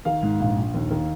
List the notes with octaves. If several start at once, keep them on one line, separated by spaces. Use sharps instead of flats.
D#3 F5
G#2
A#1 F5
A#1
D#2
D#3